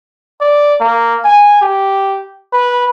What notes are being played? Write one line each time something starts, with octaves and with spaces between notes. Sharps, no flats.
D5
A#3
G#5
G4
B4